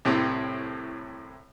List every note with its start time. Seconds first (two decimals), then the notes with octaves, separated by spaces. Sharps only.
0.05 C2 A2 C4